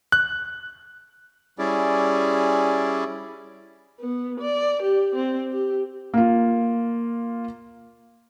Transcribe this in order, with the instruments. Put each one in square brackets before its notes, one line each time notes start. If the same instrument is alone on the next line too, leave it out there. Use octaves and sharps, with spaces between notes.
[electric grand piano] F#6
[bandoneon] G3 C#4 E4 G#4 D5
[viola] B3
D5
G4
C4
G4
[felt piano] A#3 F4